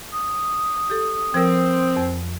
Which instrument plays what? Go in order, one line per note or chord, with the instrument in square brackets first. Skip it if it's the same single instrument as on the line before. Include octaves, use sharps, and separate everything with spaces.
[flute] D#6
[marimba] G4 A4
[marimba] F3 A#4 [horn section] C4
[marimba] F2